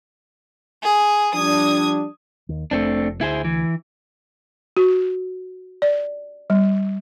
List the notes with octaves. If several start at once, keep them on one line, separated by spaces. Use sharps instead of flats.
G#4
F3 G3 D4 D#6 G#6
D#2
F1 A3 C4 D4
D2 E4 G#4 C5
E3
F#4
D5
G3